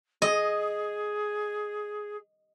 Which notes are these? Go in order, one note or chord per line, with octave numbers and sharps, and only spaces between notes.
G#4 D#5